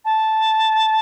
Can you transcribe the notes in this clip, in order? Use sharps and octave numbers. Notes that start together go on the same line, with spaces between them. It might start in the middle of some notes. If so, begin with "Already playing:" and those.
A5